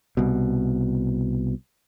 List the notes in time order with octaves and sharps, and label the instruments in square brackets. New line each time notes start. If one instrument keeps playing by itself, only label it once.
[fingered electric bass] C2 B2